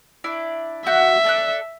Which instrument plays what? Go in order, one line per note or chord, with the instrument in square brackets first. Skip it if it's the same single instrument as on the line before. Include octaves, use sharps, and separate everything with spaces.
[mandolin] D4 E4 D5
[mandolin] F#4 F#6 G6 [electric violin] E5
[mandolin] A4 D5 F#6